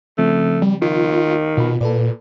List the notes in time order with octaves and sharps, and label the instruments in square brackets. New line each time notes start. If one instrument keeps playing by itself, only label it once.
[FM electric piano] C#3 F3 C4 [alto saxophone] A3
[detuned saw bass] G3
[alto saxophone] D#3 [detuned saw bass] F4
[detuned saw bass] B2 [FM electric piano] F4 B5
[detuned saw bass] A#2 [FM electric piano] A4 B4 D5